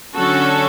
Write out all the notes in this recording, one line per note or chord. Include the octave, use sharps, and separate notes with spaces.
D3 F#3 C#4 F#4 A4